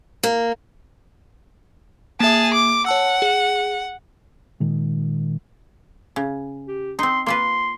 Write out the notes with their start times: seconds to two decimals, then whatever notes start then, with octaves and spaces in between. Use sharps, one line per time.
0.23 A#3
2.20 A#3 G#4 E5 A5
2.54 D6
2.86 C#5 F#5 A5 E6
3.22 G#4
4.60 A#2 D#3 G#3
6.16 C#3
6.68 G4
6.99 C4 D#4 C6
7.26 A#3 F4 B4 C6